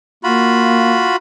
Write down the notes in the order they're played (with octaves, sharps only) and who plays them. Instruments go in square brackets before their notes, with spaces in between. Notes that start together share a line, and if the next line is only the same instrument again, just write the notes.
[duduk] A#3 [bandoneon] F4 F#4 B5